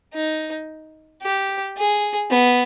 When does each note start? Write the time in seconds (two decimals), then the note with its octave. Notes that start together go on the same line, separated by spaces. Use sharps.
0.14 D#4
1.22 G4
1.77 G#4
2.31 B3